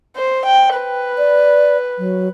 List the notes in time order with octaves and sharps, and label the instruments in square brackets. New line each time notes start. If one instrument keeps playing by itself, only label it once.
[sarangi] C5
G5
B4
[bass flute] D5
F#3